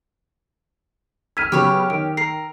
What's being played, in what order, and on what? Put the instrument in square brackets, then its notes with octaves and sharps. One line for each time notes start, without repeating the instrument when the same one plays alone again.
[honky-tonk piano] E6 F6 [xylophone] G#6 B6 D#7
[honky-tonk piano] C#3 F#3 B3 [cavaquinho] G4 C#5
[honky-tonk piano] D#3 [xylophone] D7
[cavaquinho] A#4 [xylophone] C7